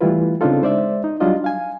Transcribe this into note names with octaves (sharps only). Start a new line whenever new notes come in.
E3 G3 A3 E4 F4 B4
C#3 C4 D4 D#4 F4 A4
G#3 C5 D5 E5
D#4
F#3 G3 D4 F4 D#5
F5 G#5